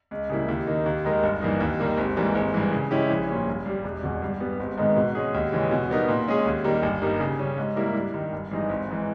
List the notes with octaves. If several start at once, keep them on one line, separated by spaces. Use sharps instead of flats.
C#2
C#3 G3 A#3 E4
D#2
D#3 A#3 D#4
D#2
D#3 G#3 D#4 A#4
G1
G2 E3 A#3 D#4
D#2
D#3 G3 A#3
G#1
G#2 E3 G3 A#3
G#1
G2 E3
C#3
G#3 C#4 E4 G4
A#1
A#2 G3 C#4
G1
G2 G3
E1
E2 B2
G2
G3 B3
G#1
G#2 D#3 G#3 B3
B2
G#3 C#4 G#4
D#2
C#3 E3 G#3 C#4
B2
G3 B3 D#4 A#4
A#2
G#3 C#4 G#4
D#2
D#3 G3 A#3
G1
G2 G3 A#3 D#4
C#3
G3 C#4
G#2
G3 A#3 E4 A#4
G2
D#3 G3
G1
G2 E3 G#3 D#4
G#1
G#2 E3